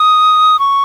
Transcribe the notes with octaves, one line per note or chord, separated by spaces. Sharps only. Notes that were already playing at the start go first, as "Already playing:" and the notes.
Already playing: D#6
C#6